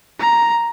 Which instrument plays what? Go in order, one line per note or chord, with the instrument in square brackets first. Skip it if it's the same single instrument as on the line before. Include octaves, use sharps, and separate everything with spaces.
[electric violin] A#5